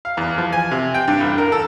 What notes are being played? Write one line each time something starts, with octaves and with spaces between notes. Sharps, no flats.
F5
E2
F3
G#5
C3
G5
G2
A1
A#4
A4